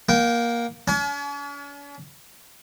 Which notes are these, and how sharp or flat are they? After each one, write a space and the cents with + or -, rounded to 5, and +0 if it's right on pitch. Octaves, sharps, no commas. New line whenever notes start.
A#3 +15 G5 -20
C#4 +45 G#5 +40